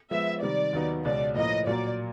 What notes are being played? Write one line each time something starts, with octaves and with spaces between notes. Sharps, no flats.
F3 G#3 B3 E5
C3 D#3 G3 D5
D#2 D#3 F#3 B3 D#4
C#2 B2 G#3 C#4 D5
A2 F3 A#3 D#5
A#2 F#3 A#3 D5